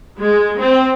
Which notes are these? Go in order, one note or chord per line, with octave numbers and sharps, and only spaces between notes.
G#3
C4